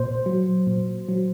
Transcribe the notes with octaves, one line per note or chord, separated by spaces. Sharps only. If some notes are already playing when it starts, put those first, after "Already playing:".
Already playing: A#2 C5
F#3
A#2
F#3